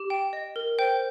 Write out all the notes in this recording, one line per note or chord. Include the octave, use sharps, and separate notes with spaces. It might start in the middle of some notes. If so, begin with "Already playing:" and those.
Already playing: G4
G5
D#5
A#4
C5 G5 G6